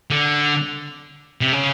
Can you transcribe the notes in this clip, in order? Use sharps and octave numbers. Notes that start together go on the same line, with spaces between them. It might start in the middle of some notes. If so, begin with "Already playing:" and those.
D3
C3
C#3